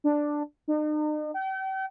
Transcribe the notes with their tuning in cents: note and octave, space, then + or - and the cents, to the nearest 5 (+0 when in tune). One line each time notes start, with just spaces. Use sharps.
D4 +5
D#4 -45
G5 -40